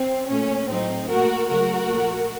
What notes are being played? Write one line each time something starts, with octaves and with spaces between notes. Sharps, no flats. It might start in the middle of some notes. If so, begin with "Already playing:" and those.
Already playing: C4
A#2 A3 C#4
A2 F#3 A3 C4 D#4
A#2 A3 F#4 A#4
C#3 F#3 A3 F#4 A#4
A#2 F3 A3